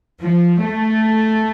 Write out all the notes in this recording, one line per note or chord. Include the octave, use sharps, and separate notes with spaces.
F3
A3